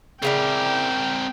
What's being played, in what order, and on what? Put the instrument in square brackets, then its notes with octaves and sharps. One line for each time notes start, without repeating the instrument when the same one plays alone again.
[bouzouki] C#3 E4 D5 [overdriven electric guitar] C4 A#4 [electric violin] G5